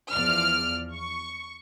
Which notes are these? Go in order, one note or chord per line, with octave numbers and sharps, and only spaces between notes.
E2 F3 D5 F6
C#6